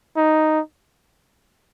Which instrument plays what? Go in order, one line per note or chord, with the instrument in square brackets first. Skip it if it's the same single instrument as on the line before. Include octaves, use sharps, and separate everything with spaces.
[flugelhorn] D#4